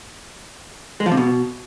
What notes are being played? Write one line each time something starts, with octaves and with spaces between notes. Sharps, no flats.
G#3
F3
C3
B2